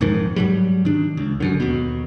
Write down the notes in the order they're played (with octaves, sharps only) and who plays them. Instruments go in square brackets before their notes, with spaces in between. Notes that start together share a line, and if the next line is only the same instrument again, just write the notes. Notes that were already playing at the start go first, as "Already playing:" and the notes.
[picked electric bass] D#1 F2 G#2 D#3
G#2 F#3 G3
D#3 D4
C#2
G1 F#2 D3
D#2 B2